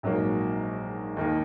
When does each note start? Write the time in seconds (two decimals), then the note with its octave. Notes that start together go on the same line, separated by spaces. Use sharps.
0.03 A#1 G#2 F#3 A#3
1.17 D#2 D#3 A#3 D#4